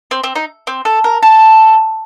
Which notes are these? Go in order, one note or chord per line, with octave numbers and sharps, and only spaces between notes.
C4
C4
D#4
C4
A4
A#4
A4